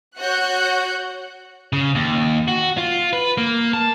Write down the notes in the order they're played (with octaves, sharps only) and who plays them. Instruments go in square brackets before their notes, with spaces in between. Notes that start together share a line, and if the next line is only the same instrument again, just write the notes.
[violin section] F#4 C#5 F#5 F#6 G6 C#7
[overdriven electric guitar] C#3
D#2
F#4
F4
B4
A#3
A5